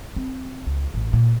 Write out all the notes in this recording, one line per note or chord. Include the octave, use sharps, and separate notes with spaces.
C4
C#2
A1
A#2